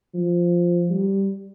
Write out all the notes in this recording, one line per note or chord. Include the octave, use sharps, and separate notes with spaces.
F3
G3